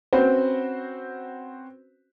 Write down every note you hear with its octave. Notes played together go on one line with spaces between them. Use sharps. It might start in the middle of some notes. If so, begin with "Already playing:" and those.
C4 C#4 F#4 B4 C5